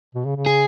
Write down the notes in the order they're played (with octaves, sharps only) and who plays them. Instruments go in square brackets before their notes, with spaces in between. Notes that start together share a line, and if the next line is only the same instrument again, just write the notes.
[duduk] B2
C#3
C#3
[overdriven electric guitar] G#4